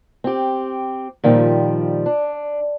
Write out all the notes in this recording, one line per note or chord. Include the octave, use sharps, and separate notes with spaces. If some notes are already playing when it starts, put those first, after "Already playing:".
C4 G4
A#2 D#3 F3 G3
D4